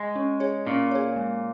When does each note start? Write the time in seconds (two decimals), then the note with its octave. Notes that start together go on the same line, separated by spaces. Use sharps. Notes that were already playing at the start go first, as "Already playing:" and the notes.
Already playing: G#3
0.16 C#4
0.40 G#4 C#5
0.67 A#2 C#4
0.91 G#4 C#5
1.16 G#3